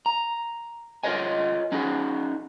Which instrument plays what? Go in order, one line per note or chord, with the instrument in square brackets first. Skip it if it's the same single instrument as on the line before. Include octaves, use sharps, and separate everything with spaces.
[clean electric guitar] A#5
F4 A#4 B4 C#5 D#5 G#5
C#4 D#4 F#4 G#4